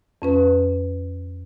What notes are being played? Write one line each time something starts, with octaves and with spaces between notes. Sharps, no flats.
F2 C#4 B4